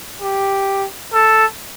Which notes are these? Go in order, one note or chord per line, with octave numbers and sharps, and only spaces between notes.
G4
A4